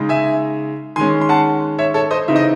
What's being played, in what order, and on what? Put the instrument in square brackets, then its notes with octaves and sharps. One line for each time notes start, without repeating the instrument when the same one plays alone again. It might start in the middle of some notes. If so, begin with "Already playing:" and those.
Already playing: [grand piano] C#3 G#3 D#4
E5 G#5
D#3 G#3 C#4 G#5 C6
C6
F#5 A5
C#5 E5
A4 C#5
C5 D#5
C#3 E3 C4 D#4 E5
D#5